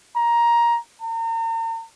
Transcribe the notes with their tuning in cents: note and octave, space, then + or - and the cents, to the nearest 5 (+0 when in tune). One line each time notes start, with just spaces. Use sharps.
A#5 +15
A#5 -40